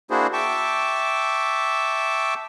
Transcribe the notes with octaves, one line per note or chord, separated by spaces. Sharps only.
A#3 D4 E4 F#4 G#4 C5
E5 G5 A5 C#6 D6